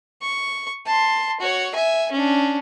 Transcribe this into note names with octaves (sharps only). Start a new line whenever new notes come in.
C#6
A5 C6
F#4 C#5
E5 G#5
C#4 D4